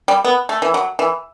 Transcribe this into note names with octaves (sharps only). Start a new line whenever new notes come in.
G3
B3
A3
E3
F#3
E3